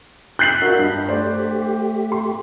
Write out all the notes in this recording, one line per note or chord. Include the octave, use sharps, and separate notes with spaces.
F#6 G6 A6 B6 C7 F#7
D4 F4 F#4 A#4 E5
G2 D#5 B5
A3 G4 C5 D5
C6